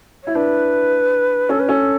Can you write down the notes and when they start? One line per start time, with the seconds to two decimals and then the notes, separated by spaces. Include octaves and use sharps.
0.23 E4 C#5
0.35 D4 B4
1.49 C#4 A4
1.59 B4
1.68 C#4 A4